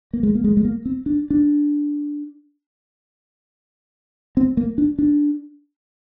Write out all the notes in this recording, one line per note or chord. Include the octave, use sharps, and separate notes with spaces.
A#3
G#3
A#3
G#3
G#3
A#3
C4
D4
D4
C4
A#3
D4
D4